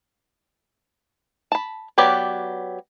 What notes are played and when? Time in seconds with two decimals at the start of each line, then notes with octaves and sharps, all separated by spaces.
1.52 A5 B5
1.98 F#3 B3 G4 B4 D5